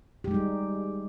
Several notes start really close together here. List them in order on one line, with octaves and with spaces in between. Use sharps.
G4 G#3 D#4 G3